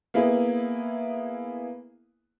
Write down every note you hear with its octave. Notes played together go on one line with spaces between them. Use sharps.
A#3 B3 E4 G#4